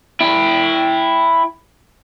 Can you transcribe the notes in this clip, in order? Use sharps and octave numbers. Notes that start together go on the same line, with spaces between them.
E4 G5